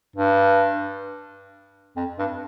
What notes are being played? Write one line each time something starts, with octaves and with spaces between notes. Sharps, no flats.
G2
F2
G2